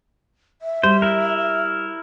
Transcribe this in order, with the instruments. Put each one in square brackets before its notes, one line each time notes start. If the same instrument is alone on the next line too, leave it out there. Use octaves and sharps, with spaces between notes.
[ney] E5
[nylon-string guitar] G3 [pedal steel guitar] C5
[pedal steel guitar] E4 A#4